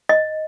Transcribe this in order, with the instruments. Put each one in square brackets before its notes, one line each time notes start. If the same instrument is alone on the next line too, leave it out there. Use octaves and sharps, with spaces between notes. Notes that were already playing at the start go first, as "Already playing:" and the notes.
[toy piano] D#5